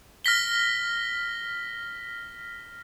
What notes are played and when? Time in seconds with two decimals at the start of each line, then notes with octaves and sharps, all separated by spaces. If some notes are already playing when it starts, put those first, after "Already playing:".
0.25 F6 A#6 B6 G7